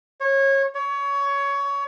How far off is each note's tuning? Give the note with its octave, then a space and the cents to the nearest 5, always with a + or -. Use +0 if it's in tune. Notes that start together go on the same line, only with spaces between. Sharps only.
C#5 -25
C#5 +20